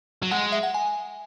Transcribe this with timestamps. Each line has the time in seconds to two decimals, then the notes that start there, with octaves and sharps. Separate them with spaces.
0.22 F#3
0.31 G#3 F#5
0.52 E5
0.63 F#5
0.74 G#5